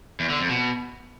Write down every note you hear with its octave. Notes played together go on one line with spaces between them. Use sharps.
E2
D3
F2
B2